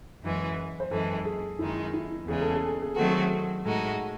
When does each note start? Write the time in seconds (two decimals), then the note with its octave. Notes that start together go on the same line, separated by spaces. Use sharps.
0.24 F#2 E3 G#3
0.80 C5
0.91 F#2 E3 G#3 A4
1.25 G#4
1.59 F#2 D#3 G#3 D#4 E4
1.94 E4
2.27 E2 C#3 G#3 G#4
2.41 A4
2.55 G#4
2.69 A4
2.82 G#4
2.96 D#3 F#3 A3 C4 F#4 A4
3.09 G#4
3.65 A2 G#3 D#4 F#4 A4